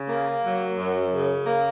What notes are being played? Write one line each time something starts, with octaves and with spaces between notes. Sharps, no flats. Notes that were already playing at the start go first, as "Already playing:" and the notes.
Already playing: C#3
A#3
F#3
F#2
C#3
A#3